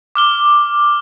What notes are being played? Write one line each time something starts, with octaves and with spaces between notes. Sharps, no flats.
D6 F6 G7